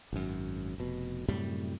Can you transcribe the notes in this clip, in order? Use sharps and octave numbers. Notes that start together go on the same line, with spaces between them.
G#1 F#2
F1 B2
F#2 A2 C3 G3